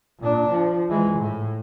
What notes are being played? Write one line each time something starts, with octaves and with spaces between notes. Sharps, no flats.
A#2 D4
F3
E3 G#3
A2